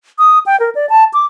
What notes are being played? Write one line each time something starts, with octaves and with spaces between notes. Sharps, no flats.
D#6
G5
A#4
D5
A5
D6